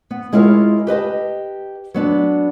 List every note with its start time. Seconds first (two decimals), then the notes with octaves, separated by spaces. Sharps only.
0.11 B3
0.33 G#3 E4 F4 G#4 A#4 C#5
0.87 G4 B4 D#5 A5
1.94 F#3 B3 D4